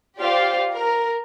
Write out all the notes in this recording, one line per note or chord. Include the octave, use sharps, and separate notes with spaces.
F4 G4 C5 D5 F5
A#4